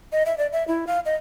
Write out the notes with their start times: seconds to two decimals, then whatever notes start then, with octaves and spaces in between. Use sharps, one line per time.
0.12 D#5
0.26 E5
0.38 D5
0.52 E5
0.68 E4
0.87 F5
1.06 D#5